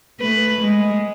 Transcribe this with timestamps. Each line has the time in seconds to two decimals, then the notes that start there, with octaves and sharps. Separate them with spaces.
0.20 A3 B4
0.59 G#3